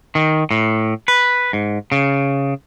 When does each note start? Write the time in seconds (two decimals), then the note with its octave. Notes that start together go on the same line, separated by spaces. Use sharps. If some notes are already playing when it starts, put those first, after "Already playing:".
0.15 D#3
0.51 A2
1.08 B4
1.53 G#2
1.92 C#3